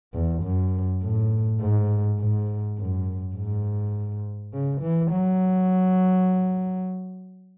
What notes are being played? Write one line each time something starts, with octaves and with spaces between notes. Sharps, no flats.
E2
F#2
A2
G#2
G#2
F#2
G#2
C#3
E3
F#3